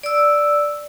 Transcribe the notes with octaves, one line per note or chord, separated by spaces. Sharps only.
D5 E6